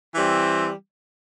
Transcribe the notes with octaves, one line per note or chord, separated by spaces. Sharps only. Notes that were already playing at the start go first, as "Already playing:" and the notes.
E3 G3 C4